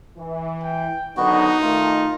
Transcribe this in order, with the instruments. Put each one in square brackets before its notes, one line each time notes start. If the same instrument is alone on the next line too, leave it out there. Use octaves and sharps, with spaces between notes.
[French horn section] E3
[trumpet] G5
[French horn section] D3 D#3 F#3 [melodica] B3 F#4 [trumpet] D#4
[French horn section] D#3 A3 [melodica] F4